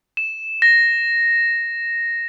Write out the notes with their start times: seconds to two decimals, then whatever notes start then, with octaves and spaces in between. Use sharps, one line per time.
0.17 E7
0.62 A#6